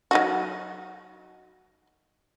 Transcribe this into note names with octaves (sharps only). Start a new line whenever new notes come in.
F#3 D#4 F#4